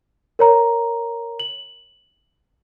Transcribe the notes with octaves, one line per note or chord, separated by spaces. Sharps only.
A#4 C#5 A#5
F#7